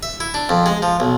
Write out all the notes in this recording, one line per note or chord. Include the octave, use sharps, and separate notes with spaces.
E5
E4
D4
F2
G#3
F3
B1